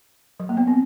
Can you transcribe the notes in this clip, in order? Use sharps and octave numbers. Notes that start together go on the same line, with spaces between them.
F#3
A#3
B3
C4